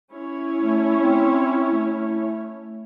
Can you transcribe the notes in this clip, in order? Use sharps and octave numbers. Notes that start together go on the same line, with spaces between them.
C#4 E4 C#5
A3
C4
A3